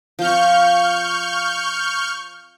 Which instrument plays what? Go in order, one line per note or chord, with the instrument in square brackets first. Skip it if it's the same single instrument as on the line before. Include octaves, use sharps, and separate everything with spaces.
[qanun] F3 C4 [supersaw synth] C#6 F6 G6